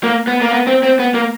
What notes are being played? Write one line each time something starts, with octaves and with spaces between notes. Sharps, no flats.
A#3
B3
A#3
B3
C4
C4
B3
A#3